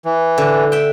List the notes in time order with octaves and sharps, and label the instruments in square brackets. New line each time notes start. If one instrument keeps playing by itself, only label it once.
[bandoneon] E3
[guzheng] D3
E5 G5